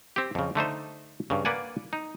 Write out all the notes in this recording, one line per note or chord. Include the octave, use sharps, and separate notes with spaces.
C4 G4
F2 C#3
D3 A3 D#4 C5
G2 C#3
A#3 B4 D5 F#5 G#5
D#4